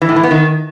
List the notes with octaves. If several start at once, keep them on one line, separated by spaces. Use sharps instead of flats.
E3
A2
E3
B3
D#3